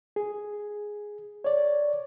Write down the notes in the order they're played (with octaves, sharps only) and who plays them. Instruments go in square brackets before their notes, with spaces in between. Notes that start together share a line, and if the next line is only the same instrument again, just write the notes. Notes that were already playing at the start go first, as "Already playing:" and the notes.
[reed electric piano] G#4
C#5 D5